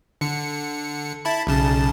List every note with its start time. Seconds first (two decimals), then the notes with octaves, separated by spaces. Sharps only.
0.21 D3 C#7
1.25 E4 A5 B5
1.47 B1 C#3 A5